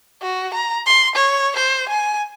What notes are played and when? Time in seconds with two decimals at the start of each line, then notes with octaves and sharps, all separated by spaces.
0.22 F#4
0.54 A#5
0.86 C6
1.16 C#5
1.56 C5
1.89 G#5